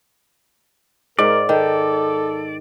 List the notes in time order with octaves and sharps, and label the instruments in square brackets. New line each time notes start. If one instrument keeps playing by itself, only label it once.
[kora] G#2 [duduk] A#4 [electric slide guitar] D5
[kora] D#3 [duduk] A4